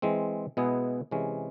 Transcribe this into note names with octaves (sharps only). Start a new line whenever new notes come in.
E3 G#3 C4
B2 G#3 B3 E4 G#4
C3 E3 G#3 C#4